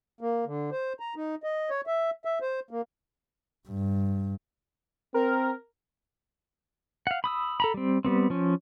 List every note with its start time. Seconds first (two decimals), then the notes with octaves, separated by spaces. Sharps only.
0.21 A#3
0.46 D3
0.71 C5
1.00 A#5
1.16 D#4
1.43 D#5
1.70 C#5
1.87 E5
2.25 E5
2.41 C5
2.71 A#3
3.68 G2
5.14 C4 A#4
7.07 F5 F#5
7.24 B5 D#6 E6
7.60 A4 A#5 B5
7.74 G3 C4
8.05 G3 B3 C4
8.30 F3 C#4